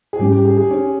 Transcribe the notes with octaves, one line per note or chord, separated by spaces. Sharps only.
G#4
G#2 G3 C#4 G4
G4
G#4
G#4
C#4